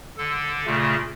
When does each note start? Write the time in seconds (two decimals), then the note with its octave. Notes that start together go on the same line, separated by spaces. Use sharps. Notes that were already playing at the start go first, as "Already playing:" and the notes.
0.17 D3 A4
0.66 A#2 C#3 A3